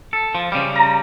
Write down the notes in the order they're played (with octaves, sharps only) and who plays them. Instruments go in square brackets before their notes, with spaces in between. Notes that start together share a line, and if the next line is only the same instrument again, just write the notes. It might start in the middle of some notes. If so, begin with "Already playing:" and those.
[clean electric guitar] A4
F3
C#3 G3
[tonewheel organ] A#5